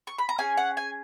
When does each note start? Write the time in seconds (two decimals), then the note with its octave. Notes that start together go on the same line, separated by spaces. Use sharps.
0.07 C#6
0.18 B5
0.29 A#5
0.38 C#4 G#4 G#5
0.57 F#5
0.77 G#5